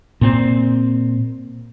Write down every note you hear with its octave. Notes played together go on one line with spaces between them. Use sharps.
A#2 C4